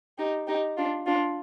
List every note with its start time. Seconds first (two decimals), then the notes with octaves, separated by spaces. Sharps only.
0.18 D#4 G4
0.47 D#4 G4
0.77 D4 F4
1.06 D4 F4